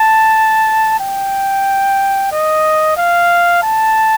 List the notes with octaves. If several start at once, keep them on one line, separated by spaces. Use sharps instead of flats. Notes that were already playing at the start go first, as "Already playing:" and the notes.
Already playing: A5
G5
D#5
F5
A5